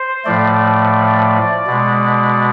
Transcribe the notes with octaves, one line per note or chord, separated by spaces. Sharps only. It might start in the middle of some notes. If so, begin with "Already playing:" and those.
Already playing: C5
A2 F3 A3 D5
B2 G#3